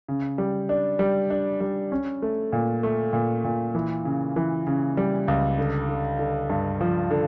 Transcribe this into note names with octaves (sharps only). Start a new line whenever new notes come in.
C#3
G3
D4
G3
D4
G3
C#4
A3
A#2
A3
A#2
A#2
E3
C#3
E3
C#3
G3
C#2
D3
D3
D3
G2
F3
D3